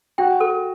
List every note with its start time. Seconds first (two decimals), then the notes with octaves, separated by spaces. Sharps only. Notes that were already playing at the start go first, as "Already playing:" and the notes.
0.18 F#4 G5
0.40 A4